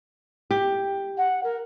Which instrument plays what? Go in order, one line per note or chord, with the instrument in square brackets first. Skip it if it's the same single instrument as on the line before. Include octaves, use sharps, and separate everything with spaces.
[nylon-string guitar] G4
[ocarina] F#5
A#4